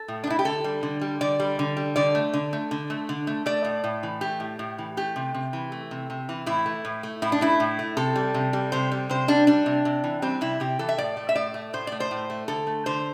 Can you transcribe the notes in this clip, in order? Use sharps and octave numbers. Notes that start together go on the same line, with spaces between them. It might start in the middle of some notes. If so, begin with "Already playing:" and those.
Already playing: A4
A2
D4
A3 E4
G4
D3 A4
G3
D3
G3
D3 D5
G3
D3
G3
D3 D5
A3
D3
A3
D3
A3
D3
A3
A3 D5
A2
A2
E3
A3 G4
A2
A2
E3
A3 G4
C3
C3
E3
A3
C3
C3
E3
A2 E4
A3
A2
A3
A2 E4
D4
A3 E4
A2
A3
C3 A4
G3
C3
G3
C3 C5
G3
C3 C5
G3 D4
G3 D4
C3
C3
E3
G3 C4
C3 E4
C3 G4
E3 A4
E5
A2 D5
A3
E5
A2 D5
A3
A2 C5
A3 D5
C5
A2
A3
D3 A4
A3
D3 C5